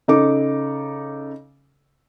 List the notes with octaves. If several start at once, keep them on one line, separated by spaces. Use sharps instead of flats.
C#3 D#4 A4 D6